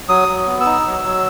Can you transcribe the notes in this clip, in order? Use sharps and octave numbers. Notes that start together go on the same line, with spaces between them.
F#3 D#6
F#3
B3
E6
D#4
F#3
F#3